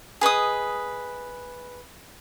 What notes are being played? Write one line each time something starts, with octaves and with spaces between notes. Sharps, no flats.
G#4 B4 D#5 D#6